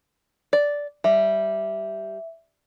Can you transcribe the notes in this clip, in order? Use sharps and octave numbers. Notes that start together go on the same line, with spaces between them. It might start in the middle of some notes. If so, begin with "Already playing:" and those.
D5
G3 E5